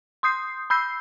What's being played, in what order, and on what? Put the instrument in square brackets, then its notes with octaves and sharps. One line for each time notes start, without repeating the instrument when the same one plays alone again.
[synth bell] C6 D#6 G6 C7
B5 E6 G6 C7